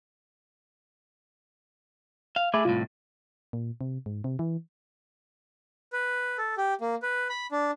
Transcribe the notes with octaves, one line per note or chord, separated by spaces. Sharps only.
F5
A3 G#4 E5 B5 D6
C2 A2 F4
A#2
C3
G#2
C3
E3
B4
A4
G4
A#3
B4
B5
D4